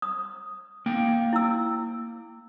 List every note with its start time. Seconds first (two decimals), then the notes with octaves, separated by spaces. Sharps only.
0.02 D#6
0.86 A#3 G5
1.33 E4 E6